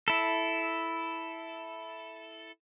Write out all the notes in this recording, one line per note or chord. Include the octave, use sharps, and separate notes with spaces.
E4 A4